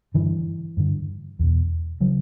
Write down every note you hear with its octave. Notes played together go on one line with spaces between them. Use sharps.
G2 D3 E3
G2 D3
E2 B2
C#3 F#3